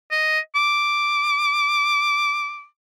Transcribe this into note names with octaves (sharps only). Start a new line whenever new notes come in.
D#5
D6